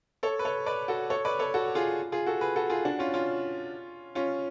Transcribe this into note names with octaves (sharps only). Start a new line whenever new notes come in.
A4 C#5
B4
A4 C#5
B4 D5
F#4 A4
A4 C#5
B4 D5
A4 C#5
F#4 A4
F4 G#4
F4 G#4
F#4 A4
G#4 B4
F#4 A4
F4 G#4
D4 F#4
C#4 F4
C#4 F4
C#4 F4